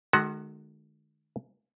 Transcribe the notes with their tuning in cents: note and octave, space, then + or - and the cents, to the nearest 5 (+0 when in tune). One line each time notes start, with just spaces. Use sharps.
D#3 -40 G#3 +35 F#4 +0